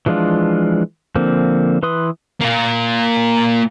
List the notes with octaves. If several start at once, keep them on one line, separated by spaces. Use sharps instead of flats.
E3 F3 G#3 D4 F4
D3 F3 A#3 C4
E3 B4 C6 D#6
A#3 F4